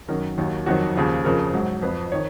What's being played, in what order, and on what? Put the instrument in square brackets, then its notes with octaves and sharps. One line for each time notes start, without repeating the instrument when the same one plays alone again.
[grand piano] F#2 D#3 F#3 A#4
D#2 D#3 F#3
F2 D#3 F#3 F#4
D#2 C#3 F3
F2 C#3 F3 A#4
G#2 F#3
F2 F3 B4
D#3 C#5